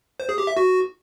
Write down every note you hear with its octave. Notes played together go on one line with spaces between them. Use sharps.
C5
G#4
G4
E5
F#4